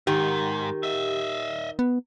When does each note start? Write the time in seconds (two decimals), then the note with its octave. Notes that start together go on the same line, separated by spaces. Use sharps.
0.07 G#2 D#3 G4
0.83 D#5 E5
1.79 B3